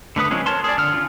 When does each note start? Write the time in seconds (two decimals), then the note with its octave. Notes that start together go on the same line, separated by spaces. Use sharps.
0.16 D3 A3 B4 D#6
0.31 F3 G#3 C4 C#4 G#4
0.46 A#4 C#5 A5 C6
0.64 G#4 D5
0.78 D3 F6
0.94 C#4 F4